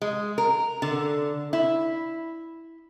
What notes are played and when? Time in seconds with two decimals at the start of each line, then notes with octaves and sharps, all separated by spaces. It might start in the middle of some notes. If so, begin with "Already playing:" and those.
0.02 G#3
0.38 A#4
0.82 D3
1.53 E4